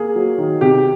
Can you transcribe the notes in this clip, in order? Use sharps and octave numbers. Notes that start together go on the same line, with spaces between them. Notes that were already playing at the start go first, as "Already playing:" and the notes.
Already playing: A#3 G#4
F#3
D#3
C3 G4